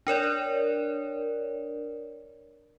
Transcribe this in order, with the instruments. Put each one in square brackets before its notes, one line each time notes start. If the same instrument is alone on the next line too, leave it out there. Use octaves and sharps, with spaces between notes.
[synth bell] D4 A#4 C#5 D5